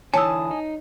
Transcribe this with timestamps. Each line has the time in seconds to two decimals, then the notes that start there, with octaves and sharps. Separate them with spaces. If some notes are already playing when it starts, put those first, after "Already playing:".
0.14 D3 E3 C#5 G#5 A5 D#6 E6
0.51 D#4